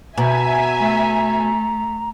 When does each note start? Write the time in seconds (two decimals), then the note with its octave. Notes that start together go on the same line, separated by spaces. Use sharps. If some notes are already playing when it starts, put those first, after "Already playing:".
0.18 B2 E5 G#5 A#5
0.81 A3